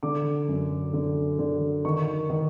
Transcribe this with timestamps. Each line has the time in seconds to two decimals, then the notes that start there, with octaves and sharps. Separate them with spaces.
0.03 D3 D6
0.48 F#2
0.93 D3
1.39 D3
1.85 D#3 C#6
2.30 D#3